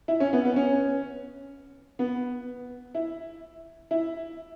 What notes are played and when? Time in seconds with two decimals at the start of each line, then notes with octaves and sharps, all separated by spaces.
0.08 E4
0.20 C#4
0.33 B3
0.45 B3
0.56 C#4
1.99 B3
2.95 E4
3.91 E4